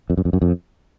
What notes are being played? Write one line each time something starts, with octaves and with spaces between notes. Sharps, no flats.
F2
F#2
F2
F#2
F2